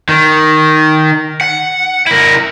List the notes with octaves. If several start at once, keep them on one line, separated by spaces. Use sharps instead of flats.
D#3
F#5
E4 A#4